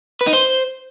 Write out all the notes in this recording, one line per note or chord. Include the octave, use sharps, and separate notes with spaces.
B4
D#4
C5